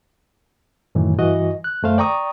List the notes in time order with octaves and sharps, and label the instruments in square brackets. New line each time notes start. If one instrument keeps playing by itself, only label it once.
[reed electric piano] F#2 A2 D#3 E3
G2 E3 F#4 D#5
F#6
F#2 A3 C5 F5
D5 G5 A#5 C#6 D#6